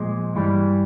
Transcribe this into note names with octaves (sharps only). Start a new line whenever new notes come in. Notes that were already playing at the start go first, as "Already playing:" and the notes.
Already playing: A#2 F3 G#3
G2 E3 G3